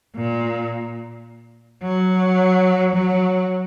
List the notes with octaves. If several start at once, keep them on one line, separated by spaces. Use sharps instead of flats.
A#2
F#3
F#3